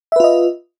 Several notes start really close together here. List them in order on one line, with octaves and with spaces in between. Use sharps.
E5 B4 F4 D#5